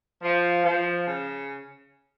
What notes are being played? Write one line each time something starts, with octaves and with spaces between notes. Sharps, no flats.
F3
F3
C#3